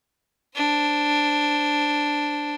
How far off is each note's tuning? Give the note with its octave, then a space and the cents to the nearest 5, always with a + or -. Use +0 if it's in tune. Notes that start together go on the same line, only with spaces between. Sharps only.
D4 +0 C5 +0